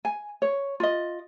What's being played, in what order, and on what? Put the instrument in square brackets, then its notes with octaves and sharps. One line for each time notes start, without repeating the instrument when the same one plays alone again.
[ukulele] G#5
C#5
F4 D#5